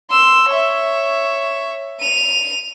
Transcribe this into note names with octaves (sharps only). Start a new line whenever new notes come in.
C6 E6
C#5 E5
D#7 F7